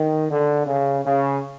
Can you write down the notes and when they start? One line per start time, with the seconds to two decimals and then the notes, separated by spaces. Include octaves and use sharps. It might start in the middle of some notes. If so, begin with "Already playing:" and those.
Already playing: D#3
0.29 D3
0.66 C#3
1.04 C#3